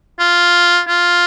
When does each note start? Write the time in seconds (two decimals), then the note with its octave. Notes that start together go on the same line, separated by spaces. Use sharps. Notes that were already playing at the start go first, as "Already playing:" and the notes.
0.19 F4
0.88 F4